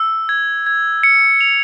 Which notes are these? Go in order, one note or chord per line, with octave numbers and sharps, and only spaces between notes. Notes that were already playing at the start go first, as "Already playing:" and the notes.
Already playing: E6
G#6
G#6
C#7
F7